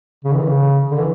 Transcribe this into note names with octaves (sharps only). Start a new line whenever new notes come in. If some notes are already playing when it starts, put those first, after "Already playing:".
C#3
E3
C#3
D3
E3